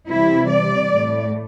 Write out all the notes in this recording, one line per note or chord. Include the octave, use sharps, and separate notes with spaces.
C3 E3 G3 E4
D5
A2 A3